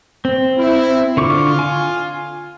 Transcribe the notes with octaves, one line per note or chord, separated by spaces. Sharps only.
C4
E4
D3 F4 C#6 D6
G#5